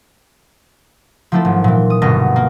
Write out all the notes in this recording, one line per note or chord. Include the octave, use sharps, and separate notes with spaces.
F3 F#3 A3 C4 E4 A4
G#1
A#2 E3
D#6
G1 B2 B3 F#4 D#5 A#5
A#3